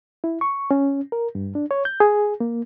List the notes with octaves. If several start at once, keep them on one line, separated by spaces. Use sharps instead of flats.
E4
C#6
C#4
A#4
G2
D4
C#5
G6
G#4
A#3